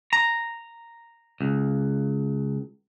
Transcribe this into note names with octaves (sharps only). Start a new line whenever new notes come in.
A#5
C#2